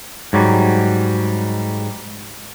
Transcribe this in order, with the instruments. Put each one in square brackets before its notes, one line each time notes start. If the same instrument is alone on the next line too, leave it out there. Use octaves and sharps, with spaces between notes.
[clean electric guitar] G#2 F#3 G3